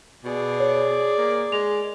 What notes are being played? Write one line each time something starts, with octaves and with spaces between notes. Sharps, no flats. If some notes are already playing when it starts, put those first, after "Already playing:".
B2 G#4 D5
C#5
A#3
G#3 F7